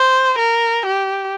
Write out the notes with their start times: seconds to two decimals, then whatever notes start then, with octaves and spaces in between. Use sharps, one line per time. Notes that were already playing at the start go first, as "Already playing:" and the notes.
Already playing: C5
0.38 A#4
0.86 G4